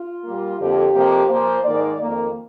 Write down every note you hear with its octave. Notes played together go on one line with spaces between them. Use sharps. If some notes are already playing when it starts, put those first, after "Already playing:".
Already playing: F4
A#2 G3 A#3
F2 D3 F3 A#3 G4
F2 C3 F3 A#3
A#2 F3 A#3 C5
G#2 D#3 A#3 D5
F2 D#3 A#3